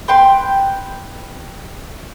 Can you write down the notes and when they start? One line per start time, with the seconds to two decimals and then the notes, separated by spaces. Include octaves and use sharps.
0.08 B4 G5 C6